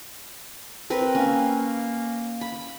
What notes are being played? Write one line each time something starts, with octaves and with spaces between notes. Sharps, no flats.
C4 A#4 B4
A#3 C#4
B5